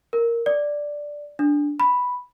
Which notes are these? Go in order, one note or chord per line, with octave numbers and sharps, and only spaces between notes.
A#4
D5
D4
B5